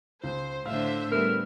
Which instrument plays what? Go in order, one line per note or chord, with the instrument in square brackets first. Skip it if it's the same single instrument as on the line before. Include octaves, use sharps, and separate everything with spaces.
[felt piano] C#2 [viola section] C5
[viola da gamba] A2 D3 [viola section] C5 E5 [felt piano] F5 F6
[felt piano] G3 A3 B3 [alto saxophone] A#4